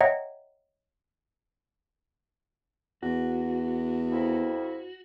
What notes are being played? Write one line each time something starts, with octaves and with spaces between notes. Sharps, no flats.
C#5 D#5 E5 F#5 G5 A#5
E2 F#4
F2 E4